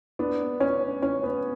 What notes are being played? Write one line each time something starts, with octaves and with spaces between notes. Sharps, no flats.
B3 D4
C#4
C#4
B3